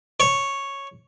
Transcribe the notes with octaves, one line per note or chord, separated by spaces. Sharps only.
C#5